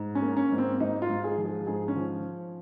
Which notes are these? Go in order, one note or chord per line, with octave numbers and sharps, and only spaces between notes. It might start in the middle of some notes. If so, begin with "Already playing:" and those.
Already playing: G#2
C#4
A#3
C#4
G#2
C4
G#2 D#4
F4
G#2
G#4
F3
G#4
G#2 G#4
C#4
F3